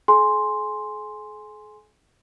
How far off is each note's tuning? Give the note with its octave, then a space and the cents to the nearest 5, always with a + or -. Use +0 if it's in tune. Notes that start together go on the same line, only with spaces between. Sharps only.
G#4 +45 G#5 +0 C6 +0